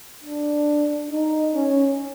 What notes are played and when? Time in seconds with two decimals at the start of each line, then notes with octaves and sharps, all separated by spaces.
0.24 D4
1.11 D#4
1.55 C#4